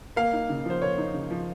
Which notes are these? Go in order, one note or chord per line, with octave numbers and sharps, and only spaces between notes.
A#3 F5
D#4
C#3
F3 C5
A#3 C#5
D#4
C#3
F3